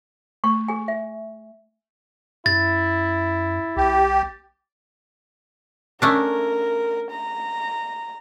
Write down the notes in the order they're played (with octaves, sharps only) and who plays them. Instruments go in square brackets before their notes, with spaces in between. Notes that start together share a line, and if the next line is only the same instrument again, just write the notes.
[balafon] A3 [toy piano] C#6
[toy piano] G#4 G#5
E5
[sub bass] F#2 [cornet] E4 [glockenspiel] A6
[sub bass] B1 [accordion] G4
[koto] A3 C#4 D4 [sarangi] A#4
[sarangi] A#5